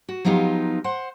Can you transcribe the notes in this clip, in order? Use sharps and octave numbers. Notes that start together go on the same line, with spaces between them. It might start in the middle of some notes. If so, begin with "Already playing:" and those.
F#4
F3 F#3 B3 D#4 F4 G4
C5 F#5